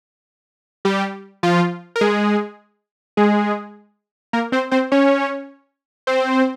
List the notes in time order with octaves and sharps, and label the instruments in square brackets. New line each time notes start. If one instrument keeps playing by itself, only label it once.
[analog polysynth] G3 G4
F3 F4
A#4
G#3 G#4
G#3 G#4
A#3 A#4
C4 C5
C4 C5
C#4 C#5
C4 C5